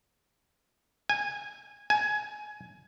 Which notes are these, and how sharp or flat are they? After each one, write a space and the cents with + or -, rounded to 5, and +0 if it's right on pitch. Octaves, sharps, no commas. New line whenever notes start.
G#5 -15
G#5 +20